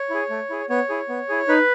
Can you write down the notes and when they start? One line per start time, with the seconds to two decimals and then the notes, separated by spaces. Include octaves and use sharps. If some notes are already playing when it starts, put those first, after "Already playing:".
Already playing: C#5
0.10 E4 G#4
0.30 A3
0.50 E4 G#4
0.70 B3 C#5
0.89 E4 G#4
1.09 B3
1.29 E4 G#4
1.48 D#4 B4